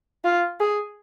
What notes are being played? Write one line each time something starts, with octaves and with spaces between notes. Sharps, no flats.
F4
G#4